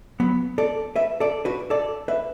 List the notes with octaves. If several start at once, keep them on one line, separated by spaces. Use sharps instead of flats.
F#3 B3
A4 D5
B4 E5
A4 D5
F#4 B4
A4 D5
B4 E5